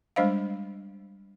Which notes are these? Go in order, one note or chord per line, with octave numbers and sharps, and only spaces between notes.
G3 G#3 D4 C5 D#5 F5